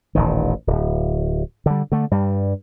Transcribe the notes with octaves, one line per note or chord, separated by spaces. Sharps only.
D#1 A1 D#3
D1
D3 G3
D3 A3
G2 G3